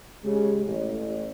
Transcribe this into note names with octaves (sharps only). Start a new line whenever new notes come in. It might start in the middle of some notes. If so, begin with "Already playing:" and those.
C#3 G#3 G4
A1